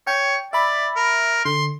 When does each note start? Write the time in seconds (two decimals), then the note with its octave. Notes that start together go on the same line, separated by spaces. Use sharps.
0.07 C#5 G5
0.53 D5 E5 B5
0.96 A#4
1.45 D3 C6